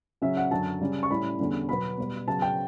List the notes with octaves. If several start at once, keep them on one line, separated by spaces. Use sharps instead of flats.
C#3 F#3 C#4 E5
F#5
F#2 D3 F#3 C#4 A5
C#3 G3 C#4
C#6
A2 G3 C#4 B5
E2 D3 G3 C#4
B2 F#3 B3 B5
B2 G3 B3
C#3 F#3 B3 A5
G5